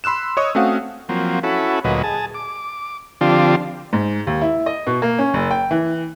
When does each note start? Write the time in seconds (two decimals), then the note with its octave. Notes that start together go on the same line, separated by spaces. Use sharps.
0.04 B5 C6 E6 F#6 E7
0.37 C#5 D#5 C#6 D#6
0.55 A3 C4 C#4 F#4 F5 F#5
1.09 F3 F#3 A#3 C4
1.43 C#4 E4 F#4 A4 B5
1.84 D2 A#2 F#3 B4 D#5
2.03 G#4 A5
2.34 D6
3.21 D3 F3 C4 D4 F4 G4
3.93 G#2
4.27 D#2
4.42 E4
4.66 D#5
4.87 B2
5.02 A#3
5.19 C#4
5.34 F#1
5.51 G5
5.71 E3